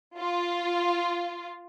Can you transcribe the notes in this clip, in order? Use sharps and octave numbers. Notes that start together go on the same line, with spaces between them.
F4